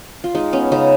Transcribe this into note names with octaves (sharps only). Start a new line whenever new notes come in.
F4
G#3 D#4
B3 C#4
C#3 D#4